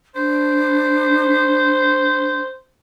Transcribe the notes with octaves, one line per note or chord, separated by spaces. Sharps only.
D4 C5